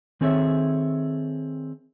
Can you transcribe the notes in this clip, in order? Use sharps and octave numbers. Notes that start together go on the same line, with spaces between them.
D#3 C4 G#4 A4 C#5 E5